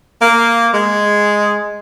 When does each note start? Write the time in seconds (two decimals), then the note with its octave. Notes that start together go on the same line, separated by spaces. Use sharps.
0.21 A#3
0.74 G#3